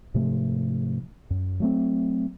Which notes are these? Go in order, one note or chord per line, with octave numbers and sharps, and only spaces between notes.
G#2 C3 F3 A3
F#2
F#3 A3 C4